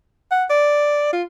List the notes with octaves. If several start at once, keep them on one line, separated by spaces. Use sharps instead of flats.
F#5
D5
F4